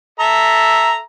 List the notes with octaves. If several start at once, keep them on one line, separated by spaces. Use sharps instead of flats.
A4 E5 A#5